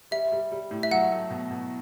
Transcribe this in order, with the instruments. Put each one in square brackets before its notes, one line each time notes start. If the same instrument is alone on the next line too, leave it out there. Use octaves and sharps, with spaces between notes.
[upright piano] G3 [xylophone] E5
[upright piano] G3
G3
A2
[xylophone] E5
[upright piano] F#3 [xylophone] F#5
[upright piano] A3
B2
B2